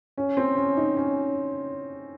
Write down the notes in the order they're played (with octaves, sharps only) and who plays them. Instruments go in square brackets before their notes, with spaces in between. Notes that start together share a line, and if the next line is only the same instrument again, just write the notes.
[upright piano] C#4
C4
C#4
D#4
C#4